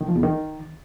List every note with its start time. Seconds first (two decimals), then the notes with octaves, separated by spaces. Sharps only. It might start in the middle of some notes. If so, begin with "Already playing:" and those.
0.01 D#3
0.08 F3
0.16 E2
0.23 D#3